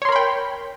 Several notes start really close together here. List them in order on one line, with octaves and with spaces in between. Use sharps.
C#5 C6 A#4 B5 G5